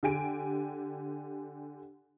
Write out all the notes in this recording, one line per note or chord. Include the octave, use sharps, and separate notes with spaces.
D3 G4 G#5 D7